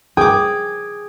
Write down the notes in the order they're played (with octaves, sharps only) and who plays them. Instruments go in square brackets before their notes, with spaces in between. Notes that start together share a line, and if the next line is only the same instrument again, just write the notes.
[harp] G#4 [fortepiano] G5 D6